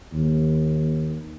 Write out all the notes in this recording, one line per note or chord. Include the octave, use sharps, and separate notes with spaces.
D#2